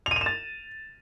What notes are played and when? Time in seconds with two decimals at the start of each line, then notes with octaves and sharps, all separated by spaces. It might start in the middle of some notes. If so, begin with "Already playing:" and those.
0.06 F7
0.11 D#7
0.16 F7
0.21 E7
0.26 A6